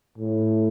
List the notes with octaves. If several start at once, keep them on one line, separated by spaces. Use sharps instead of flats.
A2